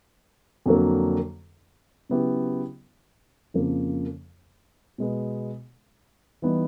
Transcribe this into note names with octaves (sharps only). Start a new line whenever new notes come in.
F2 D3 F#3 A#3
C#3 F#3 B3 E4 G4
F2 C#3 F3 A#3
B2 G#3 B3
E3 G3 B3 D#4